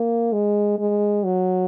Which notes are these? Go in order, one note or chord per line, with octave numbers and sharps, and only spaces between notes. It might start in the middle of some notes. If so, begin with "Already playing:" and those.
Already playing: A#3
G#3
G#3
F#3